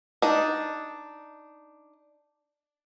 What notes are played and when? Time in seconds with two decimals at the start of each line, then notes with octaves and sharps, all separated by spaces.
0.22 D4 D#4